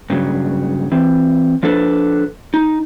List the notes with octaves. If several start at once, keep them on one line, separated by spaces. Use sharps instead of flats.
G2 C#3 F#3
E3 C4
F3 D4 A4 B4
D#4